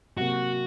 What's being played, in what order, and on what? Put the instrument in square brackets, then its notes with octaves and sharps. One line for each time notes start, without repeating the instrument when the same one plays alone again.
[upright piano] C3 F#3 A#3 [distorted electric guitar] F#4